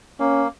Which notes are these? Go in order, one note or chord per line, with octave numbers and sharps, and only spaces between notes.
A#3 C#4